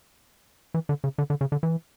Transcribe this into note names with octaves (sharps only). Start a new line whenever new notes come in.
E3
D3
C#3
D3
D3
C#3
D3
E3